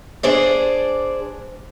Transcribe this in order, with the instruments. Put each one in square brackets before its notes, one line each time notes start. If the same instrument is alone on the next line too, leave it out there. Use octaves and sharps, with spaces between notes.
[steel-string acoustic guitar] D4 G#4 C5 D5